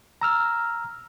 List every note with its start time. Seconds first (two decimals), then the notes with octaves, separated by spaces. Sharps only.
0.21 A#5 E6 F6